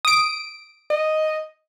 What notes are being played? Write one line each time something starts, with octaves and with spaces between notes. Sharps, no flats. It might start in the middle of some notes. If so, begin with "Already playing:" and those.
D#6 D7
D#5